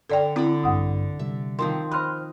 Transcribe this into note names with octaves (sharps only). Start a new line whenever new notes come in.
D3 A4 D5 G5 A#5
D3 C4 E4 D5 B5
A#1 G2 F#5 D#6
C3 G3 E5
D#3 F3 C4 C6
C5 D#5 B5 C6 F6 F#6